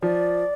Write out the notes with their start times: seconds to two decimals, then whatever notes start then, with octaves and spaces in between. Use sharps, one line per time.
0.02 F3 D5